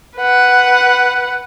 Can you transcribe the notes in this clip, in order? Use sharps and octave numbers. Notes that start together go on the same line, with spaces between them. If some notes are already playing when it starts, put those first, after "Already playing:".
B4 F#5